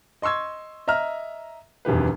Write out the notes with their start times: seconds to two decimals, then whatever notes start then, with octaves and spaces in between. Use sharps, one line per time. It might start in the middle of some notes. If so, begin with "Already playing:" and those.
0.22 D#5 C6 C#6 E6 G#6
0.88 D#5 E5 A#5 F6
1.85 E1 F#2 D#3 G4 B4